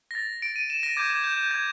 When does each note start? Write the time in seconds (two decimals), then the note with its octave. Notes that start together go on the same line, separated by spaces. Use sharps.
0.11 A#6
0.15 A6
0.42 D7
0.56 D#7
0.70 E7
0.83 A#6
0.97 D6 G6 G#6
1.10 G#6
1.24 G6
1.37 G6
1.51 G#6